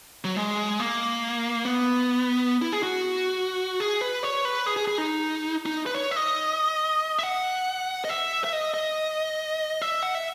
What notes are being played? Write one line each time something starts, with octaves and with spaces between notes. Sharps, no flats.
F#3
G#3
A#3
B3
E4
G#4
F#4
G#4
B4
C#5
B4
G#4
G#4
G#4
D#4
D#4
B4
C#5
E5
D#5
E5
F#5
D#5
E5
E5
D#5
D#5
E5
F#5
E5